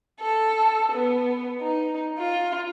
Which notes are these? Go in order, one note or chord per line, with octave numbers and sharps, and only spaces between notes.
A4
B3
D#4
F4